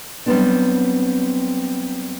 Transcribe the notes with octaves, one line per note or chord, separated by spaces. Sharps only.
F#3 G3 A3 B3 C4 D4